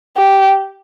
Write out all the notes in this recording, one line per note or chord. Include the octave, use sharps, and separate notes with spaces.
G4